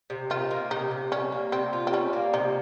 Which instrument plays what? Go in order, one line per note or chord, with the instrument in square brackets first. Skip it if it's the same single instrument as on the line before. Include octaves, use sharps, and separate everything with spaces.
[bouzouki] C3
[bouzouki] D#3 [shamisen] F4
[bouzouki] A#3
[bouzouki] C3 [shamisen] D#4
[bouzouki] C3
[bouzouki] G3 [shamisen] C#4
[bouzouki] A#3
[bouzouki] C3 [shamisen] C4
[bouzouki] F4
[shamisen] C4
[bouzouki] G3 [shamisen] C#4
[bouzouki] A#3
[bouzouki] C3 [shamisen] D#4